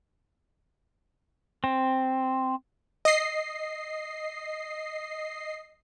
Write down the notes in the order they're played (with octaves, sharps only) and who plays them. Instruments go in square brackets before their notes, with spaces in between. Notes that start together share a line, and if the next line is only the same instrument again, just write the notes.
[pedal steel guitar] C4
[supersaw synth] D#5 C7